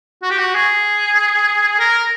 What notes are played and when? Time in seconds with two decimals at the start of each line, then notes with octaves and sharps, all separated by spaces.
0.22 F#4
0.30 G4
0.38 F#4
0.54 G#4
1.79 A#4